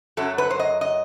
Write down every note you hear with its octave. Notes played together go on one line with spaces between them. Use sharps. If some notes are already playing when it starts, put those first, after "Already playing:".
F#2 F#3 A4
B4
C5
D#5
D#5